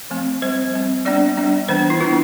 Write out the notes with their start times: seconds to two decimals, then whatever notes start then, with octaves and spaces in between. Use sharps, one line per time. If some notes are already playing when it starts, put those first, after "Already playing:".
0.10 F3 A3 C4
0.42 G3 C4 C5
0.74 G3 C4
1.05 G3 B3 D4 D5
1.37 G3 B3 D4
1.68 E3 B3 D4 C5
1.90 E4
2.01 E3 B3 D4 F4